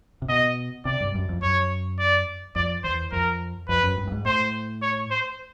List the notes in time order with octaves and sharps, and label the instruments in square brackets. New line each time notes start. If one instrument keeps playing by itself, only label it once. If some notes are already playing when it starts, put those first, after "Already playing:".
[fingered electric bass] C3
[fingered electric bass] B2 [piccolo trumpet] D#5
[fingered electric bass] C3 [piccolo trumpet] D5
[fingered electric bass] G2
F#2
F2
[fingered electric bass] F#2 [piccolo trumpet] C#5
[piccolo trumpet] D5
[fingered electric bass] F2 [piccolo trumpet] D5
[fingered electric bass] E2 [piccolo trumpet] C5
[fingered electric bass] F2 [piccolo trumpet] A#4
[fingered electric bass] F2 [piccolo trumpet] B4
[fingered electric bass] F#2
G2
G2
G#2
[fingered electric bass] A2 [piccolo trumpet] C5
[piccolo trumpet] C#5
C5